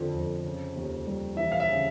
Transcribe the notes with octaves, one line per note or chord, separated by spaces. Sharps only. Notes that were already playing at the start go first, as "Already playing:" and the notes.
Already playing: F2 D3 F3
F2
C#3
D#2
G3
E3 E5
F5
E5
C#3